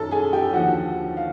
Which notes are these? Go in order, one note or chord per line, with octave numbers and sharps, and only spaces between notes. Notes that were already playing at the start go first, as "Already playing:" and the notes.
Already playing: F#2 D#3 A4 A5
G#4 G#5
G4 G5
D#2 D3 F3 F#4 F#5
F5